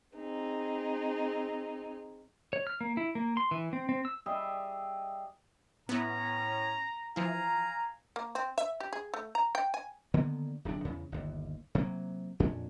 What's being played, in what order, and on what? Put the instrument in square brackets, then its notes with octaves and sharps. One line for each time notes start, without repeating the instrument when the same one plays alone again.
[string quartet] C4 D#4 G#4
[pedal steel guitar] C#5
F6
A#3
E4
A#3
C6
E3
C4
C4
E6
[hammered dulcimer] G3 G#4 D#5 E5
[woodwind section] A2 C#4 [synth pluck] B3 E4 [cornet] A#5
[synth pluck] E3 F3 E4 [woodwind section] F5 G#5 A#5
[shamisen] A#3
C4
E5
G4
G#4
A3
A#5
G5
G#5
[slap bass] D3 D#3 A#3 B3
D1 F#2 C3 D4
E2 C#3
G1 D#2
C3 F#3 A#3
F2 A#2 C#4 D4